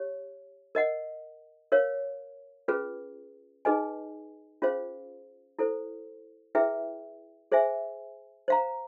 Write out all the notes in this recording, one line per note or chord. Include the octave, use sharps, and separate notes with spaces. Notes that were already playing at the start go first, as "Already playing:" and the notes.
Already playing: G4 C#5
A#4 D#5 F#5
A#4 C#5 F5
C#4 F4 G#4 B4
D#4 G#4 B4 D#5 G#5
C#4 F4 G#4 C5 F5
E4 A4 C5
E4 G#4 B4 E5 G5
G#4 C5 E5 G#5
C5 F5 A#5